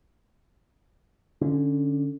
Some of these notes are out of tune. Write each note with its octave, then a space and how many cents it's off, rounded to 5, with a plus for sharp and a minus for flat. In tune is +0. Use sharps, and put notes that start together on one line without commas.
D3 +0 C#4 +10